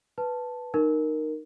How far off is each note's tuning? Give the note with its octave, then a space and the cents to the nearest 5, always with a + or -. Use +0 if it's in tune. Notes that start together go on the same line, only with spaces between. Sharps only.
B4 +0 A5 +0
D#4 -20 A#4 +0